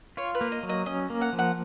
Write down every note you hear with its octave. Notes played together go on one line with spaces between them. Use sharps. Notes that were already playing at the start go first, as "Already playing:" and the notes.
F4 C#5
B4
A#3
D#5
F#3
D#5
C#4 D#5
A#3
F#5
F3
F#5